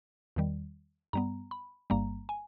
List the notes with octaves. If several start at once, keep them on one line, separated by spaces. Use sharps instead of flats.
E2 D#3 G3
G2 G3 B3 A#5
B5
G1 G2 G3 A#3 A#5
G#5